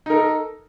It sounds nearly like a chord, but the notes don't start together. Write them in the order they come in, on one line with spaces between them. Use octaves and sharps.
D#4 A#4 A4